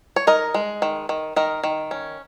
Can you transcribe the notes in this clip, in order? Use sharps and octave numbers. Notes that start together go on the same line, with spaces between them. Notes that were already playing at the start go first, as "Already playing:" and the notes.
C#5
D#4 A#4 D#5
G#3
D#3
D#3
D#3 A#4 D#5
D#3
C#4